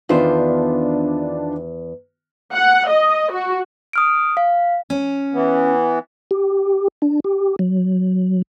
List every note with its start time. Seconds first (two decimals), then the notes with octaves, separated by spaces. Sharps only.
0.09 E2 D#3 B3 D4 F4 C5
2.54 F#5
2.89 D#5
3.33 F#4
3.93 D#6 F6 D7
4.37 F5
4.90 C#4
5.34 E3 B3
6.31 G4
7.02 D4
7.24 G4
7.59 F#3